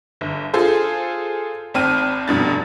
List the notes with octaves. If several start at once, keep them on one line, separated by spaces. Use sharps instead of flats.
G1
F4 G#4 A4 C5
G#1 C4 A5 F6 D#7
F1 G2 B2 A6